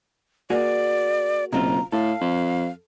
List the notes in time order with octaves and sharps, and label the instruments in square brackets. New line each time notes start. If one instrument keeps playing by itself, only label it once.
[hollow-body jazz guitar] A#3 F#4 G#4 [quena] D5
[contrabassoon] F#1 [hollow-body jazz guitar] B2 C4 F4 [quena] A#5
[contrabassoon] A2 [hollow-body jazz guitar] A4 [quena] F5
[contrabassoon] F2